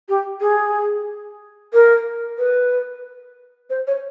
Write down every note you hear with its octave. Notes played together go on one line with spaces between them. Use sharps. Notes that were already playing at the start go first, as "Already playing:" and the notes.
G4
G#4
A#4
B4
C5
C#5